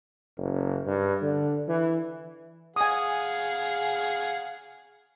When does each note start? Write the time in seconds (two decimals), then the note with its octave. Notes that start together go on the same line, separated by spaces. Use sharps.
0.37 F#1
0.86 G2
1.22 D3
1.68 E3
2.76 G#4 F5 F#5 G#5 D#6